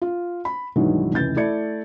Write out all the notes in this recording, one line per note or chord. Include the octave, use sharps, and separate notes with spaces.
F4
B5
B1 G2 D#3 E3 F#3 G#3
F1 C#2 E3 G6 A6
A3 E4 D5 G#6 C#7